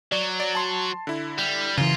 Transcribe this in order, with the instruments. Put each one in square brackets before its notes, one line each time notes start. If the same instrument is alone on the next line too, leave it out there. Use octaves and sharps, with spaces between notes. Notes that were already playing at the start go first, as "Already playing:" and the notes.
[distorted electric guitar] F#3 [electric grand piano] D5
[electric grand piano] D5
A5 C6
D3 E4
[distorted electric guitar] G3
[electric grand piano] F#2 [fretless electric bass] C#3 E3 [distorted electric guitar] F4